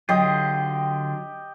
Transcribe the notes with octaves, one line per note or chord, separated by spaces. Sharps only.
D3 F#3 F4 G4 D#5 G5